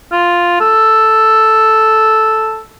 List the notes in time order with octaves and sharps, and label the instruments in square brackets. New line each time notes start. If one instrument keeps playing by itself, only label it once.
[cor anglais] F4
A4